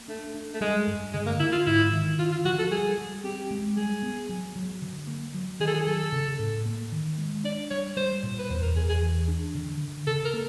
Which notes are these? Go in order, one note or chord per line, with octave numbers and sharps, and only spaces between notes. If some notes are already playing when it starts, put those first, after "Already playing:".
Already playing: A#3
A3 D4
D4
A3
G3 G#3
G2
D3 G#3
A#3
D3 E4
F4
G#2 E4
D#3
D3 F4
F4
F3 F#4
A4
G3 G#4
G3
C4 G4
G#3
G3 G#4
B3
F#3
F#3
D3
A#3
F#3
D#3 G#4
A4
G#4
F#3 A4
C#3
A2
A#3
D#3
G#3
D4 D5
G3 C#5
G3 C5
A#2
B4
E2 C5
A#4
E2 G#4
G#4
E3
D4
D3
D3
C#3 A4
A#4
A#3